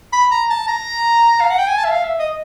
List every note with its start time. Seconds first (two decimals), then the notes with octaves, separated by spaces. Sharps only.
0.13 B5
0.31 A#5
0.50 A5
0.68 A#5
1.41 F5
1.50 F#5
1.59 G5
1.68 G#5
1.78 A5
1.85 E5
1.91 F5
2.04 E5
2.19 D#5